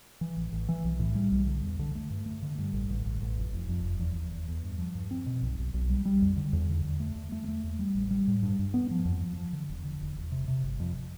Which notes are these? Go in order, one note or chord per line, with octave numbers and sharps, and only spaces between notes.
E3
A1
A1
E3
B1
A2
G3
B1
D3
E2
D3
A3
G2
A3
D3
G2
A1
A1
A1
A1
F1
F1
F2
F1
E2
E2
E2
E2
G2
F3
G2
C4
B2
B1
B1
B1
G3
G3
F2
D3
E2
D3
E2
A3
E2
A3
A3
E2
G3
A1
G3
A2
G2
G2
B3
F3
F2
F3
F3
D3
E1
D3
E1
E1
C3
C3
G1
F2